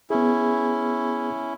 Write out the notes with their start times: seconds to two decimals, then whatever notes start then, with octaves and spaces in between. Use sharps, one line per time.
0.10 B3 C#4 E4 G#4